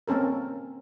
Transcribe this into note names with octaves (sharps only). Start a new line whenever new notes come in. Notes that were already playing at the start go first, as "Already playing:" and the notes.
A#3 C4 C#4 A4 A#4